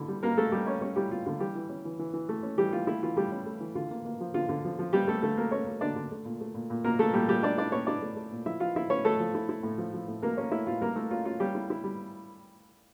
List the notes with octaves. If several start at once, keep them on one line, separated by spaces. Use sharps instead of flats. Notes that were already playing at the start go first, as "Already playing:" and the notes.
Already playing: D3 E4
G3
G3 A#3 A#4
G3 A3 A4
G3 G4
C#4 C#5
G3 C#4 C#5
G3 E4 G4
G3 F4
D3 F4
E3 G3 G4
E3
C#4
E3
E3
E3
A3
C#4
E3 G3 G4
E3 F4
A3 E4
E3 F4
G3 A3 G4
C#4
A3
E3
D3 F4
A#3
A#3
F3
D3 F4
D3
F3
F3
G3 A#3 G4
A3 A#3 A4
D3 A3 A4
A#3 A#4
A#3 C#4 C#5
A#3
D3 D4 D5
D3
A3
A#2
A3
A#2
A#2
A#2 A#3 A#4
A3 A4
A#2 G3 G4
A#2 G3 G4
A3 D4 D5
D4 E4 D5
A#2 C#4 C#5
D4 E4 D5
A3
A3
A#2
F3 E4 E5
F3 F4 F5
F3 E4 E5
A3 C#4 C#5
A3 A4
F3
E4
E4
A2
F3
F3
A2
A3 A#3 A#4
A3 C#4 C#5
A3 E4 E5
A2 F4 F5
G3 A#3 A#4
A3 E4 A4
C#4 F4
C#4 F4
G3 C#4 G4
E4
E4
G3